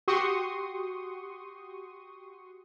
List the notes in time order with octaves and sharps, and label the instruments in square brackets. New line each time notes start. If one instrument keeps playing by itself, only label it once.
[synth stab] F#4 G4 C6 C#6 D#6